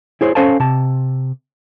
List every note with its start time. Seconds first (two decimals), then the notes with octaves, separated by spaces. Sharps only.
0.21 E4 G#4 C5 C#5
0.35 C#4 A4 C5 F5 G#5 A5
0.60 C3 A5